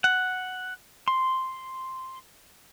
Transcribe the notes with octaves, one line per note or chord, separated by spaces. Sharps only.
F#5
C6